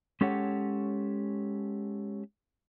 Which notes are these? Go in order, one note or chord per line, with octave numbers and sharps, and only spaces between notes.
G#3 C#4 G4 A4 C#5 F#5